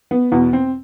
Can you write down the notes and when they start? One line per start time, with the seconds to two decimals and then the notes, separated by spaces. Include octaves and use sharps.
0.11 B3
0.32 E2 B2 B3
0.53 C4